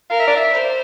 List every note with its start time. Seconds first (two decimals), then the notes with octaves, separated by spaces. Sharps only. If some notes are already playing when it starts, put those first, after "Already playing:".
0.10 A#4 F5
0.20 E5
0.27 D5
0.36 E5
0.52 C5